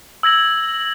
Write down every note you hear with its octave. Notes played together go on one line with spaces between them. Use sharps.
E6 G#6 A#6 F#7